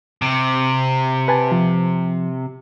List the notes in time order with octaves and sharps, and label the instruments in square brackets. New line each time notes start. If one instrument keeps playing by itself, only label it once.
[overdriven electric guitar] C3
[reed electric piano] B4 G#5 A5
F3